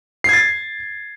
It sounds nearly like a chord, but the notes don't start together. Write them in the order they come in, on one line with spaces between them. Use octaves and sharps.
C7 G#6 A6